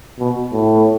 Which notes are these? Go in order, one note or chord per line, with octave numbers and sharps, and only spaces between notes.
B2
A2